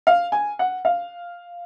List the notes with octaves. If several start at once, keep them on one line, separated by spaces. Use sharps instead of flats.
F5
G#5
F#5
F5